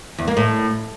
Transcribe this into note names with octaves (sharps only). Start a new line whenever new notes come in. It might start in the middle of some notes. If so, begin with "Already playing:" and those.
E2
A#3
A2